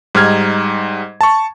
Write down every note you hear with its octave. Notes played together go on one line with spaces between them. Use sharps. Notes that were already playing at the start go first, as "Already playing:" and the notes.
G#2 G3 D#4 F6 G#6
A5 C#6